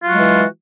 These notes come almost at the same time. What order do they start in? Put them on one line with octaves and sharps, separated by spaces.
F4 F#3 F#4 G#3 E3